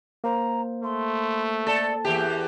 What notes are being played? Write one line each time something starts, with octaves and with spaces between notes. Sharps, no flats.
A#3 C5 A#5
A3 C6
A4 D5
E2 G4 E5